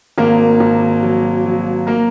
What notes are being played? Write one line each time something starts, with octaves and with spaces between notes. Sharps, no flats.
G#1 A#3 A#4
G#1
F#3
F#3
A#3 A#4